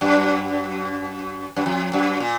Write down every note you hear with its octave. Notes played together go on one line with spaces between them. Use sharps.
F#2
F#2
F2
F#2
A#2